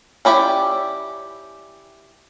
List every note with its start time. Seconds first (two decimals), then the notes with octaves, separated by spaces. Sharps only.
0.25 C#4 E4 G4 C#5 D5